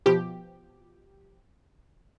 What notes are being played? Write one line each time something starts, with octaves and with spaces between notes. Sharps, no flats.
B2 F3 G4